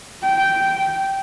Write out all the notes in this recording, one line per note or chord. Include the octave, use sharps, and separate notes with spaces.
G5